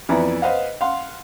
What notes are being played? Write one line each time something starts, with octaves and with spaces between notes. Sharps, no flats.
F2 E3 B3 D5 A#5
B4 C5 D#5 F5 F#5
F5 F#5 C6